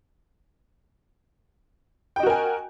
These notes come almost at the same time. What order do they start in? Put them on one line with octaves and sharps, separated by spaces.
G5 D#5 F#4 A#4 G#5